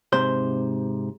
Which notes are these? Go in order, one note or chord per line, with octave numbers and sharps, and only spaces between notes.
G#2 C3 C5